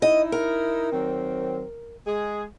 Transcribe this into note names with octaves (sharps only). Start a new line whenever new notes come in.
D#4 E4 D#5
A#4
D#3 F#3 C4
G#3 G#4